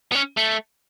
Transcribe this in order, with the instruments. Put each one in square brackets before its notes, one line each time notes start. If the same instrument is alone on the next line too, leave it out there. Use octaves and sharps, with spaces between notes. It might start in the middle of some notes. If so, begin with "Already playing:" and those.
[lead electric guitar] B3
C#4
A3